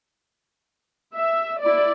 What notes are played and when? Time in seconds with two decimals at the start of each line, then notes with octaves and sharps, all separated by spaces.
1.15 E5
1.61 E4 D5